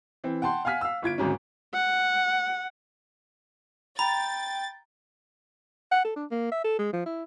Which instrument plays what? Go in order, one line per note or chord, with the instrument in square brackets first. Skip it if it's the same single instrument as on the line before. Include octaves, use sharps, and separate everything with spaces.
[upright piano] E3 C4
F#5 G5 A5 C6
F5 F#5 G#5 F6 B6
F5 E6
G1 F4 G#6 D7
G#1 D2 G#2 F#3 C#4
[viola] F#5
[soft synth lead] G5 [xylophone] A#5 [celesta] B5 [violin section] A6
[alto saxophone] F#5
A4
D4
A#3
E5
A4
G#3
F3
E4